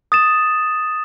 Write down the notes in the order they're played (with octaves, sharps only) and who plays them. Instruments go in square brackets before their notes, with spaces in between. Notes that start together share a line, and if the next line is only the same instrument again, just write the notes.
[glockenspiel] D#6 A6 E7